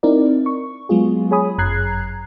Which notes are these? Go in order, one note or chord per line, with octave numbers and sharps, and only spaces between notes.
C4 D#4 E4 A#4 D5
C#6
F#3 G#3 B3 F4 G#4
G#4 C#5 G#5 B5 D#6
G1 F#2 A#5 F#6 G#6 C7